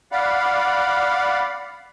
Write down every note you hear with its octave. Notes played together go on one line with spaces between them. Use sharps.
D5 F5 F#5 B5